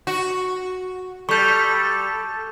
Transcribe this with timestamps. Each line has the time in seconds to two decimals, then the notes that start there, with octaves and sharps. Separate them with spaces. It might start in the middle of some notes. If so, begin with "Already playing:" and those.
0.07 F#4
1.29 G3 A4 C#6 G6